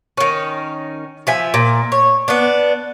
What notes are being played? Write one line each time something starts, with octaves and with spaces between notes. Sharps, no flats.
D#3 C#4
F3 E5 G#5
A#2
C#5
B3 D4